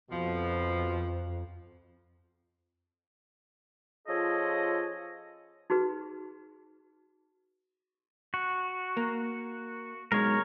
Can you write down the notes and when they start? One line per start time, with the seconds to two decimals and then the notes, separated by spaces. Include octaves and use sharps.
0.11 F2 B2 F3
4.08 F3 C#4 F4 G#4 A4 D#5
5.70 D#4 F#4 G#4 B4
8.34 F#4
8.97 A#3
10.12 B1 G#3 A#4 C#5